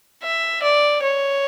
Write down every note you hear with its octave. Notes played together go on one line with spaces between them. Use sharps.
E5
D5
C#5